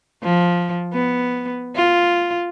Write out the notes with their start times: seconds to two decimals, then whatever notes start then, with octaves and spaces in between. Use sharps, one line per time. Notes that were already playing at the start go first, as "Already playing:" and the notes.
0.23 F3
0.93 B3
1.76 F4